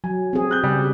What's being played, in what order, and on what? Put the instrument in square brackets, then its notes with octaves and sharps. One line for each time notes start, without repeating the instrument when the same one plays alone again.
[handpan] F#3 [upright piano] G#5
[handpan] C4 G#4
[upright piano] F#6 G6
[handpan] C#3 [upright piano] G3